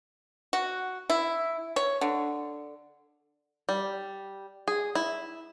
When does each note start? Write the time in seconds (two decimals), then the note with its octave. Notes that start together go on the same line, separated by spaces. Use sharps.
0.53 F#4
1.10 E4
1.76 C#5
2.01 D3
3.69 G3
4.68 G#4
4.95 E4